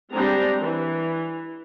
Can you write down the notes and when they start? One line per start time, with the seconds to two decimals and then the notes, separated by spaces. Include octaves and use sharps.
0.13 G3 G#3 C4 D4 A#5
0.58 E3